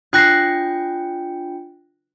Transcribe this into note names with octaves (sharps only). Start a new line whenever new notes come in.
D4 F4 G5 F#6 A#6 C7